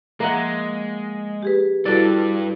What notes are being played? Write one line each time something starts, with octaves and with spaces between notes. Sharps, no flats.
F3 G#3 A#3 E5 F#5 A#5
G4 G#4 B4
G2 G3 E4 F#4 A4 B4 D5